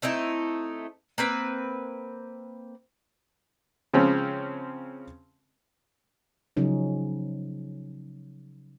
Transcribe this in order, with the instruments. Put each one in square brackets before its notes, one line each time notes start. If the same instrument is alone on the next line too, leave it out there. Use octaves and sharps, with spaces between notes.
[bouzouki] A3 C4 D#4 E4
A#3 C4 B4
[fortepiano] C#3 F3 G#3 C4 C#4
[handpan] C#3 F3 F#3 C#4 D#4